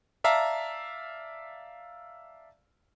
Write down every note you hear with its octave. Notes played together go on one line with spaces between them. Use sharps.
D5 E5 F5 A5 A#5